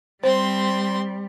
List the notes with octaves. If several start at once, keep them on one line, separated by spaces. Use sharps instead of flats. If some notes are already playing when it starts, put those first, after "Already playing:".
G3 C4 C5 C6